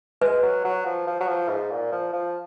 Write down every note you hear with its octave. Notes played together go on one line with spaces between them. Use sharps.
G#3 B4
F#3
F#3
F3
F3
F#3
F3
G#2
A#2
F3
F3